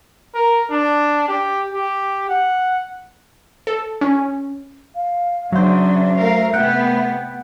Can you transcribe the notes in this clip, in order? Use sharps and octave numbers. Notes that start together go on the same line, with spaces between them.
A#4
D4
G4
G4
F#5
A4
C#4
F5
C#3 F#3 D4 C5 E5
A3 A#4 F5
C3 A3 B3 F#5 G5